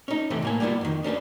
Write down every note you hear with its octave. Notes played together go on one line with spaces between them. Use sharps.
C#4 D#4
C3 E3 A3 C4 C#4
A2 A#3 G#5
G3 A#3 B3 E4 F4
F2 D#3
C#4 D4 A4 B4